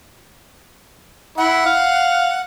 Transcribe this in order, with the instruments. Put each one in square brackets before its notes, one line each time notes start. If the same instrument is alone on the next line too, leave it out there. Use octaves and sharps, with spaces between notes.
[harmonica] E4 [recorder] F#5
[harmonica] F5